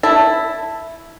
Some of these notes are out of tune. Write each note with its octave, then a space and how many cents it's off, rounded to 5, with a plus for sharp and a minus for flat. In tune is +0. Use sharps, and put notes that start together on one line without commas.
E4 +0 A5 +0